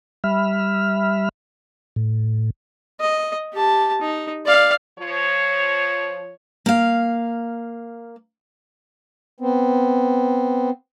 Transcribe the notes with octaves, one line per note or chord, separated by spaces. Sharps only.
G3 E5 B5 F6
A2
D#5
G4 A5
D#4
D5 F5
F3 C#5
A#3 F5
B3 C4